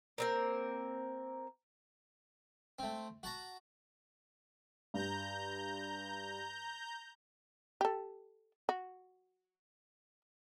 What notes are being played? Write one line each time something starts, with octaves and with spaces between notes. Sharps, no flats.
A#3 C4 A#4
A3 C4
F#4 A5 A#5
G2 A#5 G6
G4 A4
F#4